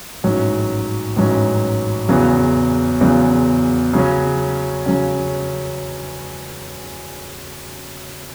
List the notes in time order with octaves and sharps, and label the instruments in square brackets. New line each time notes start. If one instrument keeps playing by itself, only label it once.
[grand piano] A1 G#2 F#3 C#4
A1 G#2 F#3 C#4
E2 C#3 F#3
E2 C#3 F#3
C#3 F#3 C#4
C#3 F#3 C#4